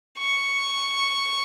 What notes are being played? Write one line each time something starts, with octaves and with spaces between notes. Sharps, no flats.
C#6